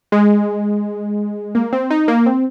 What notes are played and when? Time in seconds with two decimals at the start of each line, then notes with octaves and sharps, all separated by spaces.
0.12 G#3
1.55 A#3
1.73 C4
1.90 D#4
2.08 A#3
2.26 C4